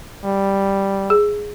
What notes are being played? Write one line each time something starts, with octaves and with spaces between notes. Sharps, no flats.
G3
G#4